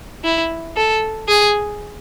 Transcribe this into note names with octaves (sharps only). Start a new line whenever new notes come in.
E4
A4
G#4